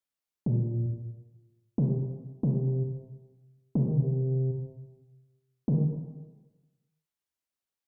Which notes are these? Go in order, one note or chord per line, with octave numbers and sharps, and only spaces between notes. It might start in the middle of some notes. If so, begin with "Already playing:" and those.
A#2
C3
C3
C3
D#3
C3
C3
D#3